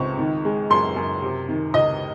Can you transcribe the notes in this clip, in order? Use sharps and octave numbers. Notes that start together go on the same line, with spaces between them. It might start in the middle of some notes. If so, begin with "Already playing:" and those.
Already playing: C#2 C4 C#6
D#3
G#3
F#2 C6
F#2
C3
D#3
C#2 D#5